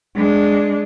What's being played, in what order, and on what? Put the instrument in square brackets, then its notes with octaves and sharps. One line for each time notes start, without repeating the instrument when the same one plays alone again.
[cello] G#3 D4